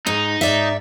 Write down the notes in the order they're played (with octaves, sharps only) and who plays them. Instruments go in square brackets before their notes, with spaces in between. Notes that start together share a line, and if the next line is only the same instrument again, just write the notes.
[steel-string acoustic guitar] G#2 [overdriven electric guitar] D#4
[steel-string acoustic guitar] G#2 D5 E5